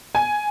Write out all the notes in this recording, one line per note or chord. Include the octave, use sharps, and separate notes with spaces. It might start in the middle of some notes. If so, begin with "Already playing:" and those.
G#5